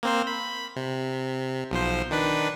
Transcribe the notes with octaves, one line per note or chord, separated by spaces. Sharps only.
A#3 C4 C5
B5
C3
B1 F3 C5
D#3 D4 B4